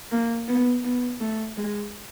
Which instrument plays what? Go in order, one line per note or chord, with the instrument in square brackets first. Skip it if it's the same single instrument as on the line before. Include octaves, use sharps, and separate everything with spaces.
[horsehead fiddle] A#3
B3
B3
A3
G#3